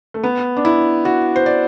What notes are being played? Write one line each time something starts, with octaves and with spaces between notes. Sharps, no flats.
A3
B3
D4
E4
F#4
C5
D5